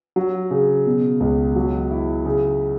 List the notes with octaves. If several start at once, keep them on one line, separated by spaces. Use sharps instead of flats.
F#3
C#3
B2
C#2
F#3
E4
C#3